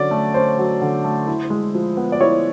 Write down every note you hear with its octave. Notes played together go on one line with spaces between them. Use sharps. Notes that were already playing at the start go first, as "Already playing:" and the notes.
Already playing: D3 F#3 C#4 D5
A3
C#4 C5
F#3
D3
A3
E4
G#3
F3
B3
D5
E4 C#5